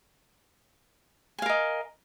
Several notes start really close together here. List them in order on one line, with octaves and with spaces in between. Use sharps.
G#5 F5 A#4 D#5